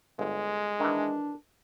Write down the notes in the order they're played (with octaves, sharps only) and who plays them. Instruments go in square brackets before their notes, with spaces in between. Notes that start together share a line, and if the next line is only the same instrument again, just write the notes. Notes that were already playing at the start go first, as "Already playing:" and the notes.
[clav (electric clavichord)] G1 [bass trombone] G#3
[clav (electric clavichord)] D#3 E3 [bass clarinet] D4